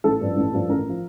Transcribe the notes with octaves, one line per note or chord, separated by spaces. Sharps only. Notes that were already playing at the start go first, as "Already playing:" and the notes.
A1 A4
G2 F3
A1
G2 F3
A1 A#4
F3